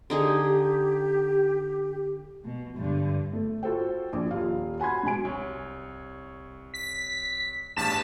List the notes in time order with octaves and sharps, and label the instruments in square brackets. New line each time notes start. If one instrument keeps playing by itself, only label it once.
[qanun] D3 D#4 G#4 [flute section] G4
[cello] B2
G2 D3
[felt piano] A3
F4 F#4 A4 C5 G5
A#1
D#1 F4 F5
F#5 G#5 B5 C6 G#6
G#2 B2 G#5 D7
[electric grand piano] C2 C#5
[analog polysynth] B6
[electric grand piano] A1 E2 G2 [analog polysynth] A5 B6 E7